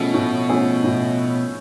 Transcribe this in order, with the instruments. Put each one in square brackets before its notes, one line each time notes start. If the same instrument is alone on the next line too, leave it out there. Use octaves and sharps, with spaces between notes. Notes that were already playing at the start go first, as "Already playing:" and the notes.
Already playing: [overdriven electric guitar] B2 [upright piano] F3 A3 C#4 G#4
[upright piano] A2
F3 A3 C#4 G#4
A2